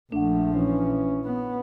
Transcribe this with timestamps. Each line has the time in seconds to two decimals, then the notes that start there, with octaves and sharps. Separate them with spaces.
0.12 A#1 F3 A3 D4 F#5
0.54 E3 C#4
1.24 B3